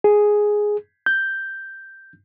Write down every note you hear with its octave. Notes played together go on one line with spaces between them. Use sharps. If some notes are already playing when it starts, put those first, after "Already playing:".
G#4
G6